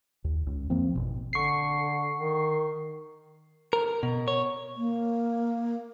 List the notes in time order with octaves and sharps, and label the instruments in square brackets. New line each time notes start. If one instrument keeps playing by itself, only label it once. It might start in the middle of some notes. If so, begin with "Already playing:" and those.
[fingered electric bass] D#2
C#2
F2 F3 A#3 C4
G#1 C#2 B2
[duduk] D3 [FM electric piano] C#6 C7
[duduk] D#3
[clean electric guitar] A#4
B2
C#5
[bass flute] A#3